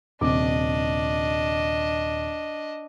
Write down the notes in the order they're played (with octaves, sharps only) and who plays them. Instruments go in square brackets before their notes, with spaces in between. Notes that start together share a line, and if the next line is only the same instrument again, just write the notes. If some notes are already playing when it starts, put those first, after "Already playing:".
[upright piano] D#1 C3 D6 [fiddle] D4 D#5